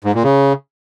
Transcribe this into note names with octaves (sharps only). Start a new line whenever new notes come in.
G#2
A#2
C#3